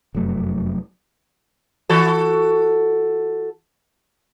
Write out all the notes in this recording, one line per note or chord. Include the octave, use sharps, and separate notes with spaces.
F1 F#2 F#3 A3
E3 F#4 A4